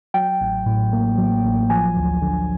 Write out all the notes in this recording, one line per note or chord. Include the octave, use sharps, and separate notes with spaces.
F#3 G5
A1
A2
A#3
F#3
A1
F3 G#5
D2
D3